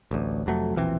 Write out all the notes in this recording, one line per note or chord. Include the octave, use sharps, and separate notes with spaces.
A1 D2
F1 F2 F#3 A3
E1 A#1 E3 C4